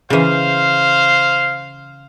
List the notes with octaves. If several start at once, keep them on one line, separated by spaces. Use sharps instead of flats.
C#3 E3 C5 F5